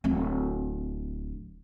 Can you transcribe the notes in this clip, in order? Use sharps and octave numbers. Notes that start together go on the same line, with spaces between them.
D1 C4